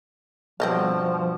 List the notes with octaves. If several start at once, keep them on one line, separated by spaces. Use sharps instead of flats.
G2 B2 F3 C4 D#5 F5